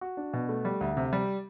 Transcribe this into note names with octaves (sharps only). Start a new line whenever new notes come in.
F#4
D4
B2
A3
G3
D2
C3
G3